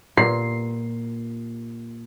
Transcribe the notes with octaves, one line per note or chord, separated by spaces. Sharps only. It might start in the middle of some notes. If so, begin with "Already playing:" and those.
A#2 C7